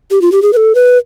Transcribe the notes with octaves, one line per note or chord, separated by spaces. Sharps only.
G4
F4
G4
G#4
B4
A4
B4